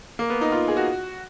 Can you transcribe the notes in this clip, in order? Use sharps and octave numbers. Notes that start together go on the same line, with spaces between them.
A#3
B3
D#4
F4
G#4
F#4